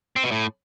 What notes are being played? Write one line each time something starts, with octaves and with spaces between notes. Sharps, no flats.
C4
B2
A2